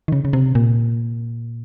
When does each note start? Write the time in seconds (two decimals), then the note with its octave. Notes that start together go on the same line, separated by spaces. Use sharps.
0.08 D#3
0.12 C#3
0.25 C#3
0.33 C3
0.55 A#2